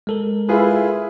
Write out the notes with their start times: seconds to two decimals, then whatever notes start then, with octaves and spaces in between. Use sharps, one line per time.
0.07 G#3 A4 A#4
0.49 E4 F4 G#4 B4